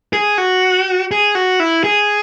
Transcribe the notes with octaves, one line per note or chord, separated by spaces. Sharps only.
G#4
F#4
G#4
F#4
E4
G#4